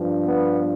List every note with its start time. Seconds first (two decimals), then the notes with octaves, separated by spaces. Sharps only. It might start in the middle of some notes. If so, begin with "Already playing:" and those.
Already playing: G2 F3
0.25 B3